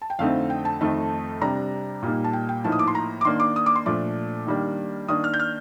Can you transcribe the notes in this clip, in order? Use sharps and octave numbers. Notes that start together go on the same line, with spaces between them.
A5
G5
F2 D3 A3 C4 D#4 F5
G5
A5
F2 D#3 A3 D#4
C3 G3 D4 A#5
A#2 G3 A#3 D#4
A5
G5
G5
A2 F3 A#3 D#4 A5
D#6
D6
C6
A#5
D6
D#3 A#3 D4 C6
D6
D#6
D6
C6
A#2 F3 A3 D4 D6
D#3 G3 A#3 D4
D#3 A#3 D4 D#6
F6
G6
F6